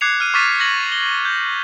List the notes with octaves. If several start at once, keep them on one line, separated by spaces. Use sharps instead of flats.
D6 F#6 G#6 C7 C#7 F7
F6 D#7
C#6 D6 F6 A6 B6 D#7
G#6 A#6 F#7
G7
G6